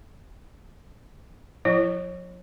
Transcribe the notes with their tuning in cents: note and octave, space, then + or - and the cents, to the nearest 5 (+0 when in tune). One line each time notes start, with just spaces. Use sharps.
F3 +40 E4 +40 C#5 -35